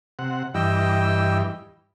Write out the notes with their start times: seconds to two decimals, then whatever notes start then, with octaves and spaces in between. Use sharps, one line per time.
0.19 C3 F#5
0.55 G2 E3 D#5 G5 E6